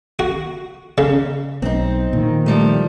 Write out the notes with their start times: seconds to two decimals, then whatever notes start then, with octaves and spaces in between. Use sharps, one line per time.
0.19 F#4
0.98 C#3
1.62 B1 C4 D#4
2.13 A#2 D#3
2.46 F3 G3 A3